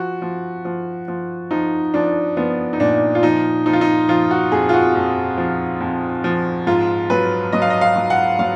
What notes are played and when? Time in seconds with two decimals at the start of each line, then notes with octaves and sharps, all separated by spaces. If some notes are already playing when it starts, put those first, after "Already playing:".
Already playing: F3 F#4
0.22 F3
0.65 F3
1.08 F3
1.51 F3 D#4
1.94 F3 D4
2.37 F3 B3
2.73 D#4
2.80 A#2 D4
3.15 F4
3.23 F3 D#4
3.66 F3 D#4
3.73 F4
3.81 D#4
4.09 F3 F4
4.31 F#4
4.52 F2 G#4
4.69 F4
4.73 F#4
4.95 F2
5.37 F3
5.81 F2
6.24 F3
6.67 G#2 F4
7.10 F#3 B4
7.53 F#3 D#5
7.62 F5
7.70 D#5
7.81 F5
7.96 F#3
8.10 F#5
8.39 F#3 F5